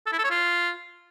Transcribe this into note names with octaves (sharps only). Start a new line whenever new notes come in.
A4
E4
A4
C#5
F4